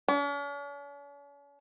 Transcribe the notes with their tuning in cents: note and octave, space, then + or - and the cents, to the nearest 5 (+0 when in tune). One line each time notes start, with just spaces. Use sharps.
C#4 +45